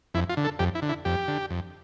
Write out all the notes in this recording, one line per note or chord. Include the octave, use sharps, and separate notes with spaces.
F2 E4
F4
D3
A4
F2 G4
E4
D3
E4
F2 G4
D3
F2